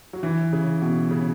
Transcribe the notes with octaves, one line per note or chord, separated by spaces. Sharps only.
F#3
E3
C#3
B2
C#3